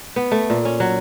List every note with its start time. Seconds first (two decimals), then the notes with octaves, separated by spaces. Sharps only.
0.16 B3
0.32 A3
0.50 A#2
0.65 C#4
0.80 F#3